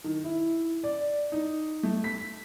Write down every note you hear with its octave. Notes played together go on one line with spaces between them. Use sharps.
D#3
E4
D5
D#4
A3
B6